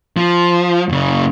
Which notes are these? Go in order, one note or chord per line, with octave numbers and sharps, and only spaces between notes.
F3
F#2 C#3